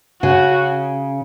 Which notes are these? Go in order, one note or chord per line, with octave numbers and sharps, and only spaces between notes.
C#3 F#4